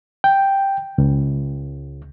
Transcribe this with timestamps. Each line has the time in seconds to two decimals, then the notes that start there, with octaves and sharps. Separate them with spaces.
0.24 G5
0.98 C#2